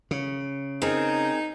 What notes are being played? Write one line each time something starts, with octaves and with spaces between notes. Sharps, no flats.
C#3
C4 D#4 G#4 A#4